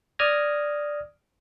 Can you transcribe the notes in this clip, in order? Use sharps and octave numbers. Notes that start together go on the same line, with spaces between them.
D5 D#6 F6 G#6 A#6